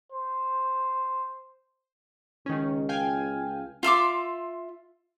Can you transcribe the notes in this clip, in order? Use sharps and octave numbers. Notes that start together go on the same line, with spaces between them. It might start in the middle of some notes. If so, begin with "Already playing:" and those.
C5
C#2 D#3 C#4
F5 G5 G#5
F4 E5 C6 D6